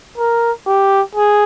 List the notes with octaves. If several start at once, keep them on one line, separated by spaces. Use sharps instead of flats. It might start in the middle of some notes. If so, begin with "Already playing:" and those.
A#4
G4
G#4